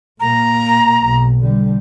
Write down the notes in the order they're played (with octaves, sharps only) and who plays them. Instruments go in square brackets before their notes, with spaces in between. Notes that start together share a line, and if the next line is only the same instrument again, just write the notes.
[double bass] A#2 A#3 [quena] A#5
[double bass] B1
D3 G3